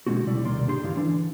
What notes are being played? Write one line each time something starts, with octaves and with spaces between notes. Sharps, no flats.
B2 D3 G#3 A3 C4 F#4
C#2 B2 G3 E4 D5
D#2 C3 D#3 A#3 D5 C6
G#2 D3 D4 G4 C5 C6
C#2 G2 D#3 E3 F5
D3 E3 D4